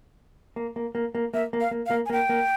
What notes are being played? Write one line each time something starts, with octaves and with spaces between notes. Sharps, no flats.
A#3
A#3
A#3
A#3
A#3 E5
A#3
F5
A#3
F5
A#3
G#5
A#3 G5
A#3